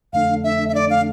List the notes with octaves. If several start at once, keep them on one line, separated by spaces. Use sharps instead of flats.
F2 D3 A3 D4 F5
E5
E5
D5
F5